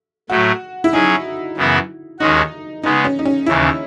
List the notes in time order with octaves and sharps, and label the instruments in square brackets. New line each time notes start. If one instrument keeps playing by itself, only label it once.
[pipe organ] A2 F#3 A3 [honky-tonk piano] F#4
[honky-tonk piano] E4
[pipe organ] F#3 C#4 G#4 [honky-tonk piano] D#4
[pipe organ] F#2 C#3 E3 B3 F#4
[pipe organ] D#2 D#3 G#3 C#4 F#4 [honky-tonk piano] D#4
[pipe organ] C#3 G#3 B3 [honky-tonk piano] D#4
[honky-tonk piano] C#4
D#4
C#4
[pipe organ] D#2 C#3 E3 [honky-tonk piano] E4